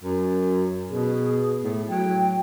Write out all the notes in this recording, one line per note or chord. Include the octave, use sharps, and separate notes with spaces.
F#2
B2 G#4
A2
F#3 G5